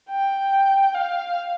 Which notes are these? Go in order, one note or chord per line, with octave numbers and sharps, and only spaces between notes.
G5
F5